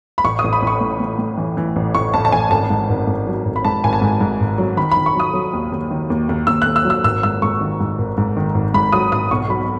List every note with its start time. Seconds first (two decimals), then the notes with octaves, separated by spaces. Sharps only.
0.18 B5
0.24 A1 C#6
0.39 D#6
0.44 A1
0.53 B5
0.62 A1 C#6
0.81 A2
1.00 A2
1.18 A2
1.37 E3
1.57 E3
1.76 A1
1.95 A1 C#6
2.14 A1 A5
2.25 A5
2.32 A1 G#5
2.51 G#1 A5
2.70 G#2
2.89 G#1
3.07 G#2
3.27 F#3
3.45 G#1
3.56 B5
3.64 G#2 A5
3.84 G#1 G#5
3.93 A5
4.01 G#2
4.20 G#2
4.40 G#1
4.58 F#3
4.77 D#3 B5
4.91 B5
4.97 D#3
5.06 C#6
5.15 F#3 D#6
5.34 F#3
5.53 D#2
5.72 D#2
5.90 D#3
6.10 D#2
6.29 D#2
6.47 D#2 E6
6.62 D#2 F#6
6.76 E6
6.85 F#3
6.90 E6
7.04 G#1 E6
7.23 G#2 E6
7.42 G#2 C#6
7.61 D#3
7.80 G#2
7.98 G#1
8.17 G#2
8.37 D#3
8.54 G#1
8.74 G#2 B5
8.92 F#3 D#6
9.12 G#1 D#6
9.31 B1 C#6
9.49 F#3 B5